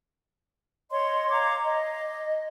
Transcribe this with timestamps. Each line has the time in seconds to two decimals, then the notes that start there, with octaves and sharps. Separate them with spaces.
0.91 C#5 D#5 C6
1.30 F5 A#5 D6 G#6
1.64 D#5